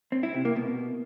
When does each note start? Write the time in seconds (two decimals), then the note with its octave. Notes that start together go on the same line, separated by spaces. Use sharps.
0.12 C4
0.23 E4
0.34 C3
0.45 A#3
0.56 B2